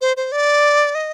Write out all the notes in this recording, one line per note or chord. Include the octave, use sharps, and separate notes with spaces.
C5
C5
D5
D#5